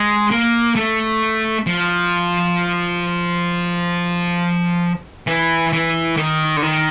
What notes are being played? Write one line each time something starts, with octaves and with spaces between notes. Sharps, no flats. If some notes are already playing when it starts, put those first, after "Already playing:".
Already playing: G#3
A#3
A3
F3
E3
E3
D#3
D3
D#3